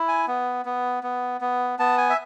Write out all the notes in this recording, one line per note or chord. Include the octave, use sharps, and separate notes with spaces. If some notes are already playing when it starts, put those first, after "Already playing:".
Already playing: E4
G#5
B3
B3
B3
B3
B3 A5
G#5
E5